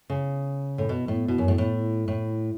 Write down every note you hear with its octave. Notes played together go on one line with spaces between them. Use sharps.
C#3
A2
B2
A2
B2
F#2
A2
A2
A2